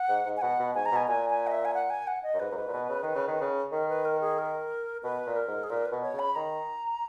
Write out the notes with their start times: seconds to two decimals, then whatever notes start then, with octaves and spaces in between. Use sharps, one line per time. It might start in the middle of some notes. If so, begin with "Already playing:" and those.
Already playing: F#5
0.09 G#2
0.26 G#2
0.37 G#5
0.42 B2 F#5
0.59 B2
0.75 G#2 G#5
0.86 A#5
0.92 B2 G#5
1.08 A#2 G#5
1.30 G#5
1.47 D#5
1.52 E5
1.65 G#5
1.74 F#5
1.90 G#5
2.07 F#5
2.23 D#5
2.34 F#2
2.40 G#2 B4
2.52 F#2
2.57 G#2
2.67 A#2
2.73 B2
2.89 C#3
3.02 D#3
3.15 C#3
3.27 D#3
3.41 C#3
3.72 D#3 A#4
3.89 B4
4.05 A#4
4.21 G#4
4.38 A#4
5.03 B2 B4
5.26 A#2
5.36 A#4
5.48 G#2
5.63 G#4
5.70 A#2 A#4
5.86 B4
5.92 B2
6.02 C#5
6.14 C#3
6.19 B5
6.35 D#3 A#5